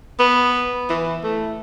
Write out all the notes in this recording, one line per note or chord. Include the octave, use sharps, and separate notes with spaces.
B3
E3
A3